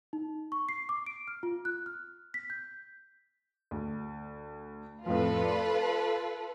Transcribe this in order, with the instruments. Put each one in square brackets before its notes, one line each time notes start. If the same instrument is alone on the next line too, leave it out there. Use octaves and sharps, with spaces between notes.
[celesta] D#4
C#6
C7
D6
D7
F6
F4
F#6
F6
B6
G6
[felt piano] D2
[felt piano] F2 A2 F3 [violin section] F4 A4 B4
[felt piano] D5